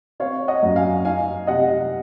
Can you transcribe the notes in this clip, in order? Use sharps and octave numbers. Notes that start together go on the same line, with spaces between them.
C4 C#5 F5
D#5 F#5
F#2
F5 G#5
D#4 F5 G#5
C3 D#5 F#5